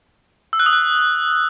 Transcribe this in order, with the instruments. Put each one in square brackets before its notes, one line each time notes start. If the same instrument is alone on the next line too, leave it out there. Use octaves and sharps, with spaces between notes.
[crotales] E6
F#6
D#6
F#6